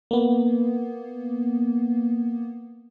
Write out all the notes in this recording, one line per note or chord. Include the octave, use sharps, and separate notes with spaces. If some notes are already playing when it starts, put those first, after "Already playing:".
A#3 B3